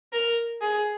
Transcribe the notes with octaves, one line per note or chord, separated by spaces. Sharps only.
A#4
G#4